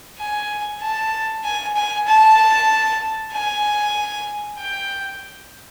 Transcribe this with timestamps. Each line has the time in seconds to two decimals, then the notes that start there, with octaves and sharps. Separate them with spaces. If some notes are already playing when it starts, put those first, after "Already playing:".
0.18 G#5
0.81 A5
1.44 G#5
1.76 G#5
2.07 A5
3.33 G#5
4.58 G5